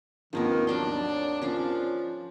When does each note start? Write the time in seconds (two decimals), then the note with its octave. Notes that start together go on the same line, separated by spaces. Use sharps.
0.33 G#1 D#2 D#3 F3 A#3 B3
0.67 F#3 D4 A5 C6
1.42 F3 C#4 D4 F5